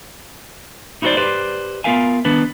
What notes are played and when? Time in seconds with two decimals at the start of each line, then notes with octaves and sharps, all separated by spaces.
1.02 D#4 E4 F#4 A#4 C5 D5
1.17 G4 B4 C5 D5
1.84 B3 F4 A#4 E5 F5 G#5
2.25 D#3 B3 D4 B4